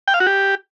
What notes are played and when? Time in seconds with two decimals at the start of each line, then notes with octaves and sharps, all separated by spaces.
0.08 G5
0.14 F5
0.20 F#4
0.27 G4